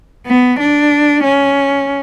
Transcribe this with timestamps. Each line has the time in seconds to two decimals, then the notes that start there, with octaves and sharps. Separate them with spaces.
0.26 B3
0.59 D4
1.24 C#4